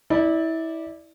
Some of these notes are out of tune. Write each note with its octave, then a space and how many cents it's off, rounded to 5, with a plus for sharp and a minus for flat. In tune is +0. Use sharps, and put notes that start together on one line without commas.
E4 -25 D5 +5